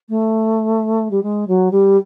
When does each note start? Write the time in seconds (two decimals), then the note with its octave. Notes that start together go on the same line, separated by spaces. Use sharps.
0.09 A3
1.11 G3
1.23 G#3
1.47 F#3
1.71 G3